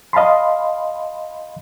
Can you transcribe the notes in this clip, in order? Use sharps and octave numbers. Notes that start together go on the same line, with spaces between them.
D#5 F5 A5 B5 C6